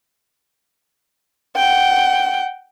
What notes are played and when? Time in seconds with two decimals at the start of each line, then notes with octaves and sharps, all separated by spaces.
1.56 F#5 G5